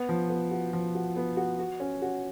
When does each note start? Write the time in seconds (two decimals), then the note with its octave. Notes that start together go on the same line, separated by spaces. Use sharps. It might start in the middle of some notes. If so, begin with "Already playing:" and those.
Already playing: B3
0.09 F3
0.30 B3
0.51 F#4
0.73 F3
0.95 F#4
1.16 B3
1.37 F#4
1.59 F#4
1.80 C#4
2.02 F#4